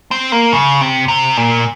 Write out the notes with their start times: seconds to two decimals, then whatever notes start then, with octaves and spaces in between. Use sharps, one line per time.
0.11 C4
0.32 A#3
0.53 C#3
0.81 C3
1.08 C3
1.37 A#2